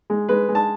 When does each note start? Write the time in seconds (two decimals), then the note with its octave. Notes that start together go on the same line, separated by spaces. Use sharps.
0.10 G#3
0.29 G#3 B4
0.49 G#3
0.55 A5